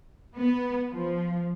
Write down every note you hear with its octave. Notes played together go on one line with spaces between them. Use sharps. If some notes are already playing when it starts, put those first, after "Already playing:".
B3
F3